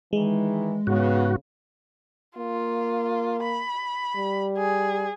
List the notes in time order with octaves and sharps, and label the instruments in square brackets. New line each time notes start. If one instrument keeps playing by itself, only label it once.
[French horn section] D#3 E3 [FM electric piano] G#3
[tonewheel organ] G#2 F#4 [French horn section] C#3 B3
[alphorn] A#3 [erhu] F4
[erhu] B5
[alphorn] G3
[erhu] G#4